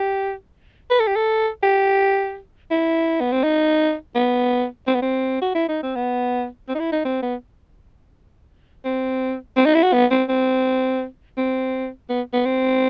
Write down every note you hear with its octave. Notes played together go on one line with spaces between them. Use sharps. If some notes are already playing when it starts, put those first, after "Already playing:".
Already playing: G4
B4
A4
G4
A4
G4
E4
B3
C4
D#4
B3
C4
B3
C4
F#4
E4
D#4
C4
B3
C4
D#4
E4
D#4
C4
B3
C4
C4
D#4
E4
F#4
B3
C4
C4
C4
B3
B3
C4